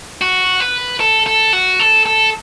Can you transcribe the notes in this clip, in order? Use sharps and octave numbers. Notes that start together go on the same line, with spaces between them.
F#4
B4
A4
A4
F#4
A4
A4